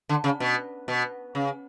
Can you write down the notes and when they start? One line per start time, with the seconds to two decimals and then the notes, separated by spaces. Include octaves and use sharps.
0.09 D3
0.24 C#3
0.40 B2
0.88 B2
1.35 C#3